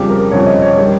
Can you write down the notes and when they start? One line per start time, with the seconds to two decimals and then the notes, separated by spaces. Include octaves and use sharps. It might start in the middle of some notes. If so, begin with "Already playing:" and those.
Already playing: F2 C#3 G3 G4
0.09 A#4
0.31 F2 C#3 G3 C#5
0.47 D#5
0.62 C#5
0.77 D#3 G3